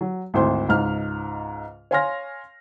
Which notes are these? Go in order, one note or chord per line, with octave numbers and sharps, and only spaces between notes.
F#3
G#1 D2 E4 C5 C6
C#2 G#2 F6
C#5 F5 G#5 C6 F6 A#6